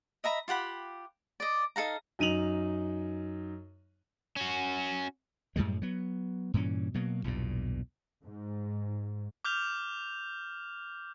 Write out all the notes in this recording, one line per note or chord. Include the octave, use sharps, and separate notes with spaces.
D#5 E5 A#5 B5
F4 G4 F#5 B5
D5 D#5
D#4 A4 F5 A#5
F#2 D#4 D#7 F7 F#7
C#4 F#4
F#2 A2 G3 G#3
F#3 B3
G2 A#2 E3 C#4
B2 F#3 A#3
B1 E2 G2 A#2
G#2
D6 F6 G6 F7